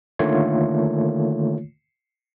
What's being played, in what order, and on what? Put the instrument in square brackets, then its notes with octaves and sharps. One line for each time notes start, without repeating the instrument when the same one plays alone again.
[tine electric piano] D3 D#3 A3 A#3 F4 C#5